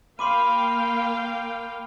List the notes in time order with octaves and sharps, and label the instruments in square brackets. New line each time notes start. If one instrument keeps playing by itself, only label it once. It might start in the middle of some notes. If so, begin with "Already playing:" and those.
[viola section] A#3 F5 G5 [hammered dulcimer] B5 [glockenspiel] C6 D6 D#7